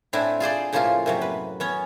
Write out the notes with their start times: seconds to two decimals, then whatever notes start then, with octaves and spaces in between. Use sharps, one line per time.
0.13 A2 C4 D4 E4 G#5
0.40 F4 G#4 C5 D5
0.72 A2 C#3 F3 A#3 F4
1.06 F#2 C3 F#3
1.21 B4
1.60 B3 C#4 C#5